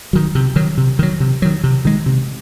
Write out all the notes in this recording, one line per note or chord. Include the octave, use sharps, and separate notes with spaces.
D#3 F#3
C3
D#3 F#3
C3
D#3 F#3
C3
D#3 F#3
C3
D#3 G#3
C3